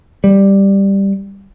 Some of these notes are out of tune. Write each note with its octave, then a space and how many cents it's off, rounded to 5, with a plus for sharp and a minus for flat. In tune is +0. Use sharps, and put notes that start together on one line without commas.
G3 +5